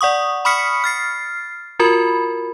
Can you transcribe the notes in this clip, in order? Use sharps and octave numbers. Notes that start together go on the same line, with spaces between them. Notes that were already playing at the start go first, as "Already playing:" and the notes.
D5 F#5 C#6 D#6
B5 C#6 D#6 F6 B6 C#7
F6 A6 C7
F4 F#4 A#4 B5